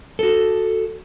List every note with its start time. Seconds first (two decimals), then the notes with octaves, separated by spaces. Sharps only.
0.19 F#4 A4